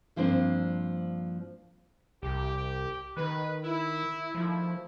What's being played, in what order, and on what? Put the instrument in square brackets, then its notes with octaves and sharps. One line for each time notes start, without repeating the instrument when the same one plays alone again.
[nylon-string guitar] G2 F3 A#3 C4 D4
[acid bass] C2 [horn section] G4
[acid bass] D#3 [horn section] B4
[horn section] E4
[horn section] D#3 A3 E4 [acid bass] F3